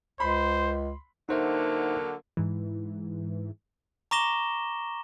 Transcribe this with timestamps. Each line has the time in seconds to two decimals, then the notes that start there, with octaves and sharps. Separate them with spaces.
0.20 C#2 C5 B5 C6
1.29 D3 F#3 A#3 D#4 C5 E5
2.37 G#2 E3
4.11 A#5 C#6 D6 A#6 E7 G7